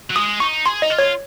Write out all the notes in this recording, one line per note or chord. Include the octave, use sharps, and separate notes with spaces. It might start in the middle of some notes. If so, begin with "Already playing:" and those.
F#3
G#3 D#6
D#4 C#6
G#4 C6
D#4 D#5
F4
C#5